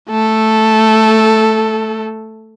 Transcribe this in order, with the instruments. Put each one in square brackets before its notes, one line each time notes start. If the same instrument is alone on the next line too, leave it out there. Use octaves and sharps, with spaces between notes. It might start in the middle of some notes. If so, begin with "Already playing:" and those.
[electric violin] A3 A4